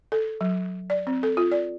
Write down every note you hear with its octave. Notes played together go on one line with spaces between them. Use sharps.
A4
F#3
D5
C4
A4
F4
D5